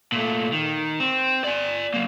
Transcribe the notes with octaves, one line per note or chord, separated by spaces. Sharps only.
A#2 A3
D#3
C4
D5 G#5
F#3 A#3